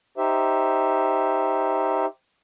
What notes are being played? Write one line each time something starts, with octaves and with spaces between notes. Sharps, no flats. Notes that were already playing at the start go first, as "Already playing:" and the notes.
D#4 G4 C5 E5